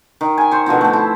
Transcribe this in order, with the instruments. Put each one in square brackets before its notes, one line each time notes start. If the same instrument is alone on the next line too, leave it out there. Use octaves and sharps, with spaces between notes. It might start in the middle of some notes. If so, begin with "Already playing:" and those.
[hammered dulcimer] D#3
G#5 B5
C5 C#5
B2 D3 F3 C4
A3 C4
E4